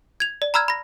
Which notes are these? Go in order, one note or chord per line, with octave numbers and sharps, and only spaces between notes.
G#6 F7
D5
A#5 B5 E6 F6 G#6
B5 A#6